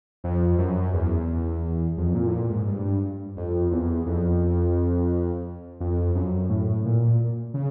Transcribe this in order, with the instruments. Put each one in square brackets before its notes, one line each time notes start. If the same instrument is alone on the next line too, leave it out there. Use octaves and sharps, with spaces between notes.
[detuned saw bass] F2
F#2
E2
F2
A#2
A2
A#2
G#2
G2
F2
E2
F2
F2
F#2
A2
A#2
C#3